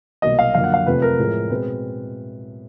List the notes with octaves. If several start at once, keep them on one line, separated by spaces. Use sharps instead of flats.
C2 B2 F#3 A#3 D#5
F5
F#2 D3 F3 A#3 F5
F#5
F5
F2 C3 F3 A3 C4 B4
A#4
A2 F3 G#3
B2 G#3 C4 B4